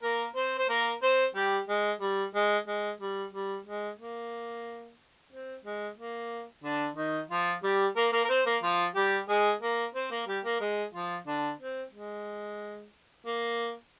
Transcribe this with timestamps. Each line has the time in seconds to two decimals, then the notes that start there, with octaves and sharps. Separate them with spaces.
0.02 A#3 A#4
0.35 C4 C5
0.58 C5
0.69 A#3 A#4
1.02 C4 C5
1.34 G3 G4
1.68 G#3
2.01 G3
2.34 G#3
2.67 G#3
3.01 G3
3.33 G3
3.66 G#3
3.99 A#3
5.32 C4
5.65 G#3
5.97 A#3
6.64 D3 D4
6.97 D#3 D#4
7.30 F3 F4
7.63 G3 G4
7.96 A#3 A#4
8.12 A#3 A#4
8.24 A#4
8.29 C4 C5
8.46 A#3 A#4
8.63 F3 F4
8.95 G3 G4
9.29 G#3 G#4
9.61 A#3 A#4
9.95 C4 C5
10.11 A#3 A#4
10.27 G3 G4
10.45 A#3 A#4
10.60 G#3 G#4
10.94 F3 F4
11.27 D3 D4
11.60 C4
11.93 G#3
13.26 A#3